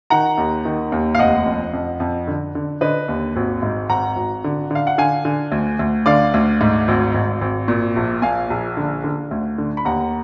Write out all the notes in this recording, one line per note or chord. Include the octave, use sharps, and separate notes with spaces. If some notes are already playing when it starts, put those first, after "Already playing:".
D#3 F#5 A#5
D#2
D#3
D#2
F5
F1 D#5 F#5
F2
F2
F2
D3
D3
D3 B4 D#5
D#2
G#1
G#2
G#1 F#5 A#5
G#1
D3
D3 F5
F#5
D3 F5 G#5
D3
D2
D2
D3 D5 F5
D2
G#2
G#1
G#1
G#1
A#2
A#1
A#2 F5 G#5
A#1
D3
D3
D2
D3
B5
D#2 F#5 A#5